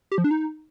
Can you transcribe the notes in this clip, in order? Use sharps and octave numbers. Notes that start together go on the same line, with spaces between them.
G4
F3
D4
D#4